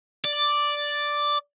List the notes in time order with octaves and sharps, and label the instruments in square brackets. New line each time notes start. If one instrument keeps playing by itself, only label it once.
[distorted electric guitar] D5